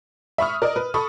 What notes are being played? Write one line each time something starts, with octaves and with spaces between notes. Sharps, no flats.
E5 B5 C#6 D#6 F6
A#4 D5 D#5
B4
A4 B5 C#6 D#6